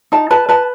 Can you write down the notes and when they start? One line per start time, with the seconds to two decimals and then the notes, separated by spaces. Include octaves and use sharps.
0.12 D#4 A5
0.31 B4 A5
0.49 B4 A5